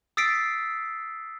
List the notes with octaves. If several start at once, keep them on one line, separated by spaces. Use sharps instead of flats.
D#6 E6 A6 B6 C7 D7